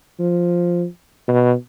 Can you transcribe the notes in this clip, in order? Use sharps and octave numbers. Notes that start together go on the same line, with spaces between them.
F3
B2